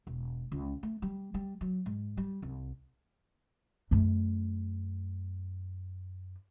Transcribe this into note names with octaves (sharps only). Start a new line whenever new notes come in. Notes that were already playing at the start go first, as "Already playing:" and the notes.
E1
C#2
A3
G3
G3
F#3
G#2
G3
C2
F#2 A3